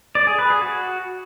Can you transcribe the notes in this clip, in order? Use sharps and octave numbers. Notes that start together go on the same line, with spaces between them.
D5
G#4
B4
G#4
F#4